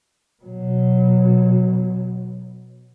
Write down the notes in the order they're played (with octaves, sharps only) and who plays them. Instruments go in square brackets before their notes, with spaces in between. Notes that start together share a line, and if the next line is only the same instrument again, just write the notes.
[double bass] B2 F#3